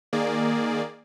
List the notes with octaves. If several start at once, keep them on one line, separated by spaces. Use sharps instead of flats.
D#3 A#3 G#4 D5